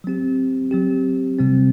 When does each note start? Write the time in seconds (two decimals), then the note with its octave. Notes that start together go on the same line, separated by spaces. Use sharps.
0.04 F#3 C4 G4
0.71 F#3 C4 G4
1.39 C3 G3 C4